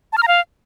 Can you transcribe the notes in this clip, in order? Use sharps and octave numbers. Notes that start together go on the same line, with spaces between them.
A5
F6
A#5
F5